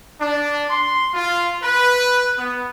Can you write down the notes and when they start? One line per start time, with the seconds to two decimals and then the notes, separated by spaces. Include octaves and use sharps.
0.21 D4
0.70 C6
1.14 F4
1.62 B4
2.37 B3